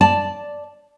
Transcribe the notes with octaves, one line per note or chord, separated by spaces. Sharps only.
D5 A5